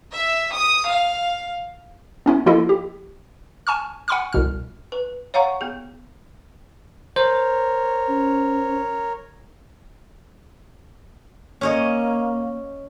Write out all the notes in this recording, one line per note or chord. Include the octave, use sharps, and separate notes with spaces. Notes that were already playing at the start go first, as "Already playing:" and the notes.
E5
D#6
F5
B3 C#4 E4
F3 A#3 E4 F4 A4 D#5
G4
G#5 A5 C#6 F6
F#5 G#5 B5 C#6 D6 F6
C2 B2 F6
B4
C#5 F5 F#5 A#5 C#6
B3 G#4
A#4 C5 C#5
C#4
A#3 C#4 C#5 D#5